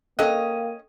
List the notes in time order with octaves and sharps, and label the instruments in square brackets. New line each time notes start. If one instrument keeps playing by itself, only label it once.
[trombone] A#3 [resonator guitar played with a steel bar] C#4 D#5 [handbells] A4 F#6 [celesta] F5 G5